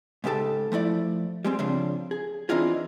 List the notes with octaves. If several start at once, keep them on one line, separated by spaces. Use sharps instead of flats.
G#2 C#3 G4 A4 A5
F3 A3 E4 D5
G3 G#3 C4
C#3 F3 C4 D4
G#4
E3 C4 D4 D#4 F4 G#4